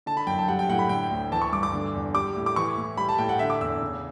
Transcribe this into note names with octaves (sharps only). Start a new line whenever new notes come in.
D3 A5
B5
F#2 G5
A5
G3 F#5
G5
A2 F#5
B5
D3 G5
D2
E3 A5
C#6
G2 D6
D6
D3
E2
G3 D6
A2
D6
E3 C#6
A2
G3 B5
A5
A2 G5
F#5
D3 E5
D6
E2 E6
C#3